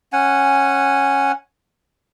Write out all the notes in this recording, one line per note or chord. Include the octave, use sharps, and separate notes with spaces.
C#4 F#5 G#5